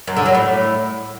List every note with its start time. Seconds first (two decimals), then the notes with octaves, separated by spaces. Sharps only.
0.07 F#2
0.17 D3
0.26 F#3
0.35 A2